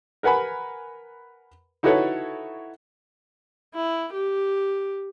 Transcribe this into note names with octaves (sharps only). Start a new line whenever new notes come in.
A#4 B4 F#5 G#5 B5
D#4 E4 F#4 A4 B4 C#5
E4
G4